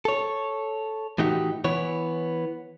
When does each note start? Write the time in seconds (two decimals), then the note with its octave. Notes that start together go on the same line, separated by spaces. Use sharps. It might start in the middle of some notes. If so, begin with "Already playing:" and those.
0.05 A4 C#5
1.18 A2 E3 D#4 F#4 G4
1.64 E3 B3 C#5